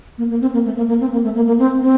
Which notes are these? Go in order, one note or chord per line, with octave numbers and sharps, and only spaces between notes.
A#3
A#3
C4
A#3
A3
A#3
A#3
C4
A#3
A3
A#3
A#3
C4
C4